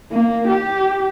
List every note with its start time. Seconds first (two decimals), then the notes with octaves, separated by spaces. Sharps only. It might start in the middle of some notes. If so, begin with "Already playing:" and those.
0.12 A#3
0.48 G4